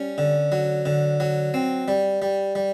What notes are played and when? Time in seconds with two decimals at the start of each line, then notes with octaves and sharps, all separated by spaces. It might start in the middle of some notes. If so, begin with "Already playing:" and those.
Already playing: G3 C#4
0.18 D3
0.52 F#3
0.86 D3
1.20 F#3
1.54 C4
1.88 G3
2.22 G3
2.55 G3